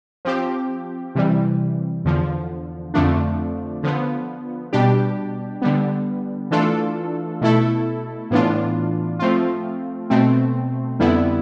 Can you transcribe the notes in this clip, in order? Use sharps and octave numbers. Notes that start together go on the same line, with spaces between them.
F3 C4 G4
C3 E3 G3
E2 D3 F3
F2 D3 F3 A3 D4
D3 F3 B3
B2 G3 D4 G4
D3 G3 B3
E3 A3 D4 F4 A4
B2 A3 E4 A4
A2 E3 B3 D4 F4
F3 A3 C4 F4
B2 A3 C4
F2 D3 G3 B3 E4